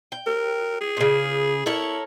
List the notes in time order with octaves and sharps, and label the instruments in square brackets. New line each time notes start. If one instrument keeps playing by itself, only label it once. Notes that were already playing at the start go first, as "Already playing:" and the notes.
[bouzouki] G5
[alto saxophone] A#4
G#4
[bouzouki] A#2 C#3
[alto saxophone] E4 [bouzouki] A4 A#4 C#5